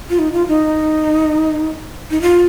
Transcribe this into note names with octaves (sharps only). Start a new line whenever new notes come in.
F4
D#4
F4
D#4
D#4
F4